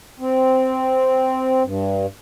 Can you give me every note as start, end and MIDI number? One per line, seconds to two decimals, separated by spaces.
0.19 1.63 60
1.64 2.06 43